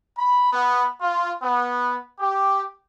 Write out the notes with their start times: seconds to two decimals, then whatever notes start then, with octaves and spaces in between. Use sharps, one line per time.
0.18 B5
0.52 B3
1.01 F4
1.42 B3
2.19 G4